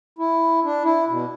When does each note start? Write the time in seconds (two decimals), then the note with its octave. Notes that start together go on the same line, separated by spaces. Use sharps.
0.19 E4
0.64 D4
0.84 E4
1.09 B2